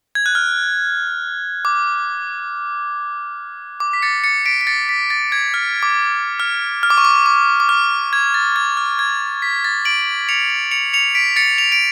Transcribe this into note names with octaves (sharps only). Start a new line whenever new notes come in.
G#6
F#6
F6
D6
D6
B6
A6 C#7
A6 C#7
B6 D7
B6
A6 C#7
B6
A6
G#6
F6
D6
F6
F6
D6
C#6
D6
D6
D6
F6
G#6
A6
G#6
F6
G#6
B6
A6
D7 F#7
C#7 F7
C#7 F7
C#7 F7
B6 D7
A6 C#7
F7
D7